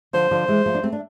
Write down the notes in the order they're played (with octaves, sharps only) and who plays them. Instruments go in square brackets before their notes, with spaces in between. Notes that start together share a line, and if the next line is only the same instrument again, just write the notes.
[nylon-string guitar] D3 F3 [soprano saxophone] C5
[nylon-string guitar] D3 F3
E3 G#3
F3 A3
D4
A3 C4
D4